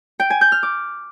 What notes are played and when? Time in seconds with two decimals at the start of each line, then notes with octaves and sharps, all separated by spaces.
0.20 G5
0.30 G#5
0.41 G6
0.52 F6
0.63 D6